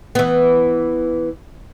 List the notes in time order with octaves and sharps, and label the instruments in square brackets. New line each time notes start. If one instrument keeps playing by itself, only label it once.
[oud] E3 B3